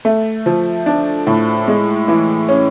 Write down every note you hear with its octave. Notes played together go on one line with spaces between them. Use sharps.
A3
F3
D4
A2
G#3
E3
C#4